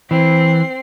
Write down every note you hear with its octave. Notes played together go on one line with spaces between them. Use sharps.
E3 C4 C7